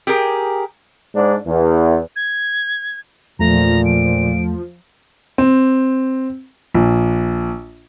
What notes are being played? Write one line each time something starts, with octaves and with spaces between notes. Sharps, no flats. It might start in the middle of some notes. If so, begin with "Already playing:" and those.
G4 G#4 A#4
G#2 D4
E2
G#6
E2 A#2 F3 A3 A#5
D7
C4
A#1